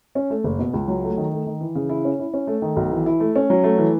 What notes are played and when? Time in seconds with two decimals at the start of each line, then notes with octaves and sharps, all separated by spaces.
0.15 C#4
0.30 A3
0.44 F#1
0.59 B2
0.74 C#2
0.88 F#3
1.03 A3
1.17 D#3
1.33 A3
1.46 D#3
1.61 E3
1.75 C#3
1.89 E4
2.05 C#4
2.20 E4
2.33 C#4
2.47 A3
2.62 D#3
2.76 B1
2.92 E3
3.06 E4
3.20 A3
3.36 C#4
3.50 F#3
3.63 A3
3.78 E3